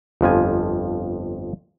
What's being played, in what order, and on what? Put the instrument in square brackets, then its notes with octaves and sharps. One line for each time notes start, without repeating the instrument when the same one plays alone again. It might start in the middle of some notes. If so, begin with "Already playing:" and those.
[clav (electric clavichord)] G1 F2 F3 G#5